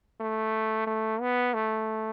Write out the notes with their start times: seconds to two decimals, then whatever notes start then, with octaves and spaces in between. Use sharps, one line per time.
0.21 A3
0.87 A3
1.21 B3
1.54 A3